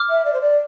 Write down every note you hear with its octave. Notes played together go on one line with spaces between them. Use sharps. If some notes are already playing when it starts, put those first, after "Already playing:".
Already playing: D6 F6
E5
D5
C5
D5